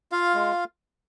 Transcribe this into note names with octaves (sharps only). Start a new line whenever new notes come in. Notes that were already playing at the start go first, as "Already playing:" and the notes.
F4 F5
G#3